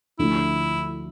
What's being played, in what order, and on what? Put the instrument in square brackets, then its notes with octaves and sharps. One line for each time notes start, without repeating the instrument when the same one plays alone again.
[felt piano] D2 D3 F3 A3 D4 [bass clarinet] E4